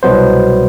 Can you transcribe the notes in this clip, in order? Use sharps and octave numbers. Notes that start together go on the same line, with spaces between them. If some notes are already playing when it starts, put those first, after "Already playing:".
C2 B2 F#3 B3 C5